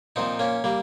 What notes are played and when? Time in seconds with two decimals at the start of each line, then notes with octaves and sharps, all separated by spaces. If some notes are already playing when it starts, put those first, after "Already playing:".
0.16 A#2 F3 C4 D#4
0.39 A#3 C#4
0.64 G3 A#3